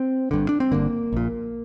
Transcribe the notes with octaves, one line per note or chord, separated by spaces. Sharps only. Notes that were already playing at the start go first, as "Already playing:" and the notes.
Already playing: C4
G1 G2 D3
D4
C4
G1 G2 D3 A#3
A#1 A#2